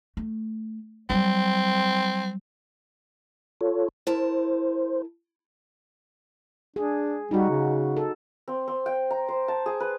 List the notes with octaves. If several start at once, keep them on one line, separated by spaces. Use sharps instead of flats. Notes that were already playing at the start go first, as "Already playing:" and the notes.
A3
F#3 G3 C4
F4 A4 C#5
E4 A#4 C5 A5
D4 G#4
G3 D#4 F#4
C#3
A4
C4
C4
G5
A#5
C5
A5
G#4
B4